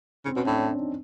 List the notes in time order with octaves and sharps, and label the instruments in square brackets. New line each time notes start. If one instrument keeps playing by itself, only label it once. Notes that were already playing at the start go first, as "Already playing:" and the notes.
[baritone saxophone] C#3 [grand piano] C4
[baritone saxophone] B2 [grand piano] C#4
[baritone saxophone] A2 [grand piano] D4
[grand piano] D4
D#4